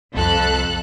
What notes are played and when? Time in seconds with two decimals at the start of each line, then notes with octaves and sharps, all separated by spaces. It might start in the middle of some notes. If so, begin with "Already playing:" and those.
0.16 C2 F2 A4 F#6